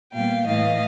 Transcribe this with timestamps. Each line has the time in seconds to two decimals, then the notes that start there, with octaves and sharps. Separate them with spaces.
0.13 A#2 G3 B3 F5 G5
0.46 A2 E3 A3 D#5 F5